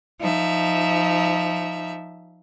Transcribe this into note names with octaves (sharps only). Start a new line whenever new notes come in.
F3 D#4 E5